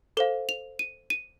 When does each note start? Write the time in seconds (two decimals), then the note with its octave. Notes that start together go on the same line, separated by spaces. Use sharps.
0.17 A4 C5 F5 G7
0.49 F7
0.79 D#7
1.10 D#7